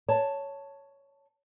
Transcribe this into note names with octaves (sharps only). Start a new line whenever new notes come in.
C#5 A5